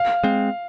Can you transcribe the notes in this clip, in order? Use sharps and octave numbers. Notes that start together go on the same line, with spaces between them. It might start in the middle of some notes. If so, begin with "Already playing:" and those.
Already playing: F5
G#3 C4